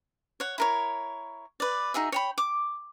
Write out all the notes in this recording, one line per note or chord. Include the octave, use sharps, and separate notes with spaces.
C#5 F#5
E4 A#4 C#5
B4 D5
D#4 F#4 G#4 E5
C#5 G5 B5
D6